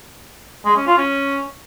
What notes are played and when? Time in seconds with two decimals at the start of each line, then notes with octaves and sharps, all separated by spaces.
0.65 G#3
0.76 C#4
0.87 F4
0.98 C#4